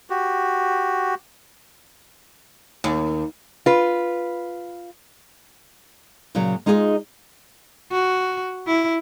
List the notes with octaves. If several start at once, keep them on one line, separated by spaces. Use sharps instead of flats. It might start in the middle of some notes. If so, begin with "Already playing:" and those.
F#4 G4
D#2
F4 B4
A#2 C#3 F#3
G#3 D#4 F4 G#4 C5 D#5
F#4
E4